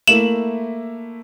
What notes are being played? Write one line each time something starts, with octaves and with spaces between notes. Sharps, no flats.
A3 A#3 E4 E7 F#7